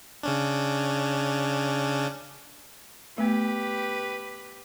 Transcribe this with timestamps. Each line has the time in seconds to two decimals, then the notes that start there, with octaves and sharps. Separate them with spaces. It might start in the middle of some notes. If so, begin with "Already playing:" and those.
0.23 C#3 C#4 D4
3.18 A3 B3 G4 B4